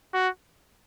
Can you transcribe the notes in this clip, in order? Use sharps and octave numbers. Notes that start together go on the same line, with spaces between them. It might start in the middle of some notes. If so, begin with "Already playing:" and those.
F#4